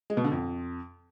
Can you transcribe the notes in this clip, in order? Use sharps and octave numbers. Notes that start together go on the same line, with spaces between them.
G#3
B2
D3
F2